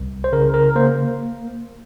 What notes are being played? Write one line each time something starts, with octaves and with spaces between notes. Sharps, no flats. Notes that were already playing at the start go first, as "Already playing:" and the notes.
Already playing: C2
C5
C#3 A#4
A#4
A#3 C5